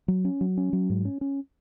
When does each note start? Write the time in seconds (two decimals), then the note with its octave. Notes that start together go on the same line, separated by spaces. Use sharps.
0.08 F#3
0.25 C#4
0.41 F#3
0.57 C#4
0.73 F#3
0.90 G#2
1.05 C#4
1.21 C#4